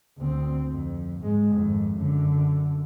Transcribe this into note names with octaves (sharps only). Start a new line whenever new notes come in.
D2 C4
F2
G#2 G#3
G#1 F2
F#2 D3